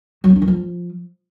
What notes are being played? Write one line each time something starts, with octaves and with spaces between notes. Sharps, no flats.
F#3
B3
D4
E3
F3